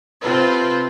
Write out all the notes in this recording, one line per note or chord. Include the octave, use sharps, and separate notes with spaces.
C3 C4 F4 A4 B4 C5